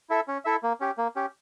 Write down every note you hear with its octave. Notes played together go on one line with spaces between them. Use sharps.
E4 A4 E5
C#4
E4 A4 E5
A#3
C#4 G4
A#3
C#4 G4